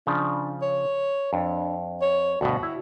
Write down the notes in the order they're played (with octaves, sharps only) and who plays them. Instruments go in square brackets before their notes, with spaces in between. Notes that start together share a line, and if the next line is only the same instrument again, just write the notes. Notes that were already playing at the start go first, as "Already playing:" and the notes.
[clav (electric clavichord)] C#3 F3 [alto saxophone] D4
[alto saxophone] C#5
[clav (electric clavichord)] F2 [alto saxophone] D4
[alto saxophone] C#5
[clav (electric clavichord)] D2 G2 B2 [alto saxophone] F#4
[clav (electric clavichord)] E4